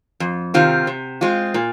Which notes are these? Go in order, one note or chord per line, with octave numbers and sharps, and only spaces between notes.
F2
C3 D#3 C4 F4
C3
G#3 C4 F4
A#2